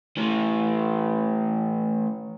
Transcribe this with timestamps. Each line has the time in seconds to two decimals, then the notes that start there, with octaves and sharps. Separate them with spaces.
0.17 E3 A3